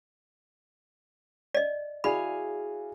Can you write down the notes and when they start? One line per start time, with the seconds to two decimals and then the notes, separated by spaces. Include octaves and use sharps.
1.55 D5 D#5
2.04 E4 F#4 G#4 D5 F5 G#5 B5